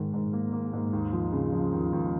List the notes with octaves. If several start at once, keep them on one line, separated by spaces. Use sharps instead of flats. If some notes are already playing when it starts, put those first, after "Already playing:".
Already playing: G#2 D#3
G#2
A#3
A#3
G#2
D#2
F3
C#3
F3
D#2
D#2